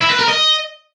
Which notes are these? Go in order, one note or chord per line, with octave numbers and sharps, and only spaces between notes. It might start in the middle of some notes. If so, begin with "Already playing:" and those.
E4
B4
A#4
D#5